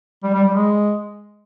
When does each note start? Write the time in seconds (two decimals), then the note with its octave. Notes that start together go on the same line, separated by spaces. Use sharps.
0.23 G3
0.34 G3
0.44 G3
0.54 G#3